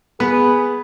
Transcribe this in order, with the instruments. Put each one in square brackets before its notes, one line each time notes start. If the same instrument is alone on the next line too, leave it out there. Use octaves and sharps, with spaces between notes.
[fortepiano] B3 [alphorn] G#4 [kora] B4